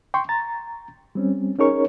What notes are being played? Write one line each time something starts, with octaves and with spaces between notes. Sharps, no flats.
G5 C6 C#6
A#5 A6
G3 C4 C#4
C#4 D#4 G#4 A#4 C#5 C#6